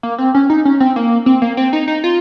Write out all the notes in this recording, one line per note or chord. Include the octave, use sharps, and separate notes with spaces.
A#3
C4
C#4
D#4
C#4
C4
A#3
C4
A#3
C4
D#4
D#4
F4